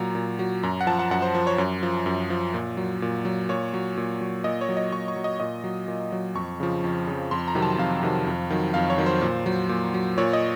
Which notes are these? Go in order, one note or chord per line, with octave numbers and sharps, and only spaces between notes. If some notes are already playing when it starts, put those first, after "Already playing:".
Already playing: A#2 F#3 A#5
A#2
F#3
F#2 A#5
F#5
F3 A5
F#5
F#2 F#5
C5
F3
C#5
F#2
F3
F#2
F3
A#2
F#3
A#2
F#3
A#2 C#5
F#3
A#2
F#3
A#2 D#5
C#5
F#3
D#5
A#2 C#6
C#6
F#3
D#5
A#2 D#5
F#3
A#2
F#3
F2 C#6
C#3 F3
F2
C#3 F3
F2 C6
A#5
C3 D#3 F#3
A5
F2 F5
C3 D#3 F#3
F2
D#3 F#3
F2 F5
C#5
D#3 F#3
C5
A#2
F#3
A#2
F#3
A#2 C#5
D#5